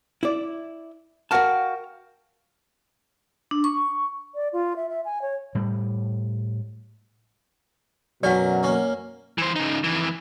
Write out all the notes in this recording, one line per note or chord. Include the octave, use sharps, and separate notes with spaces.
E4 D5
F#4 A#4 F5 G5 A5
D4
C#6
D5
F4
E5
E5
G#5
C#5
A2 G3
F#2 B2 F#3 C#4 D4 A#4 D5 F#5
A#3 C#4
E3 C5
C#3 D#4
F2 E3